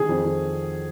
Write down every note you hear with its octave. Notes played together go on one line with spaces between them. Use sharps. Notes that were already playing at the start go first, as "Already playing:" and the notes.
Already playing: D#3 G#4
F2
F2